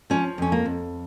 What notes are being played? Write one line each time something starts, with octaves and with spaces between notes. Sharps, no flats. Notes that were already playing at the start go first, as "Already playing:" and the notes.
F3 C#4
F2 C#4
A#3
F2